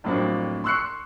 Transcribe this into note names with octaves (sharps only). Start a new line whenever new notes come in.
F2 A2 F#3 A#3 C4 D4
C6 C#6 E6 F#6 C7 C#7